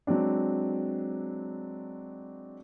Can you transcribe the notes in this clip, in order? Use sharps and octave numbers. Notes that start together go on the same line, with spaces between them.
F#3 G#3 C4 D4